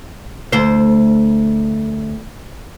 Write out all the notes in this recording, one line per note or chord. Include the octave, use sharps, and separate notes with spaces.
D2 C5